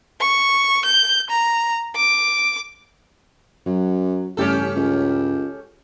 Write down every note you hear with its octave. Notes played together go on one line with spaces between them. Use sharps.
C#6
G6
A#5
D6
F#2 F#3
A1 G2 C#3 A3 C#4 G4 A4
C#2